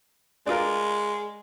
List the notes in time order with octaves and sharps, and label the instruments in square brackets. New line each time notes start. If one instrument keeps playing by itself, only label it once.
[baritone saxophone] G#3 [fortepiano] D4 F4 A#4